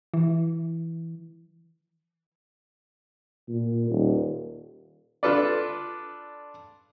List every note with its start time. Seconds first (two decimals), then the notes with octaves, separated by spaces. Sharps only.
0.14 E3
3.49 A#2
3.90 D#1
5.23 D4 F4 A4 B4 D5